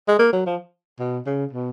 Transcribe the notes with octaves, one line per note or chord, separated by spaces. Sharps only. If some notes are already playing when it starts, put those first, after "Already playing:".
G#3
A#3
F#3
F3
B2
C#3
B2